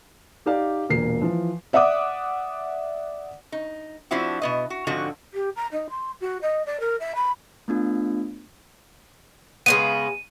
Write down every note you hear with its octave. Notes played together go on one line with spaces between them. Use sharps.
D#4 G4 D5 F5
E1 A#2 A#3 C7
E3 F3
D5 E5 F#5 D6 D#6
D#4
F3 C4 D4 E4 F#4
B2 B3 D#5
F#4
G#2 D3 F3 C4 F#4
G4
A#5
D#4
C6
F#4
D#5
D5
A#4
E5
B5
A3 B3 D4 F4
C#3 G#3 B3 D#7